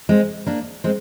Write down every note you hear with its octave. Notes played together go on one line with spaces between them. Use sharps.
G#3 C4
A#3 D4
G#3 C4